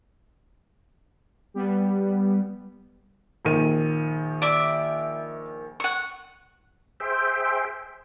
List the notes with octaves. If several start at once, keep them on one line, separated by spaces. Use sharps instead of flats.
G3 B3
A#1 D#3 D#7
D5 E5 D6
F#5 C#6
G#4 C5 E5 G5